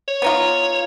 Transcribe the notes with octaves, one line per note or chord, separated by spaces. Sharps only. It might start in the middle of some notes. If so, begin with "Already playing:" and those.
C#5
B3 D#4 F4